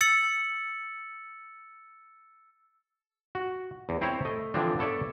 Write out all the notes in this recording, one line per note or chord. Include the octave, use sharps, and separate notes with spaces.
E6 A6 C#7 F#7
F#4
E2
C4 E4 C5 C#5 A#5
A3 D#5
D3 E3 F3 C4 D4
B3 A4 C#5 D5 E5